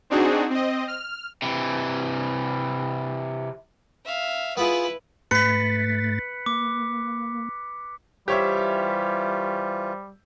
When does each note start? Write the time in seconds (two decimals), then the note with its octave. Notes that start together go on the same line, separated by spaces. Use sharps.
0.10 C4 D4 D#4 F#4 G#4
0.50 C4 D#5
0.88 F6
1.42 C3 E3
4.05 E5 F5
4.57 B3 E4 F4 G#4 B4
5.31 G#2 A3 B4 A6 B6 C#7
6.46 A#3 D6
8.28 E3 G3 F4 G4 C5 C#5 E5